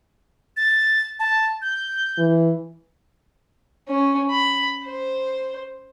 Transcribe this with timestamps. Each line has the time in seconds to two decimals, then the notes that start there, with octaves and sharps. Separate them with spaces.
0.57 A6
1.20 A5
1.62 G6
2.18 E3
3.88 C#4
4.31 B5
4.85 C5